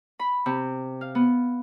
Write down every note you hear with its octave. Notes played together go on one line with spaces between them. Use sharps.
B5
C3
F5
B3